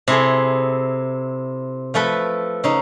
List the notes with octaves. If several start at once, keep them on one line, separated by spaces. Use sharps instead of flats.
C3 E4 G#4 A4
F3 A3 A4 B4
C#3 D#4